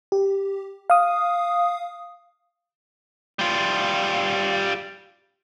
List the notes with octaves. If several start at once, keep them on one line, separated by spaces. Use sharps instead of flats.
G4
F5 D#6
G3 F4